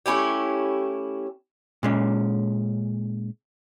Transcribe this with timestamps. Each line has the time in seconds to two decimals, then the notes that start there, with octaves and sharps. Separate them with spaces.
0.06 A3 C#4 E4 G4
1.83 A#2 G#3 C#4